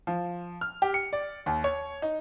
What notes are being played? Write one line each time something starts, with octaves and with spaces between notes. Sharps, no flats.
F3
F6
G4
C#7
D5
D#2
C#5
D#4